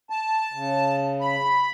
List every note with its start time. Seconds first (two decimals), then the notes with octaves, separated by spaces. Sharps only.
0.10 A5
0.52 C#3
1.21 B5